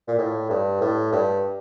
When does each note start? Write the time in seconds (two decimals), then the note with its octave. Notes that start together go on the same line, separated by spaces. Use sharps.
0.08 A#2
0.19 A2
0.50 G2
0.81 A2
1.12 G2